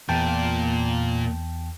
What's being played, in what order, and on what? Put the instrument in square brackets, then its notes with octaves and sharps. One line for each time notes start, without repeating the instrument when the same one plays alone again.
[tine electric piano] E2 G5 A5 [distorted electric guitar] A#2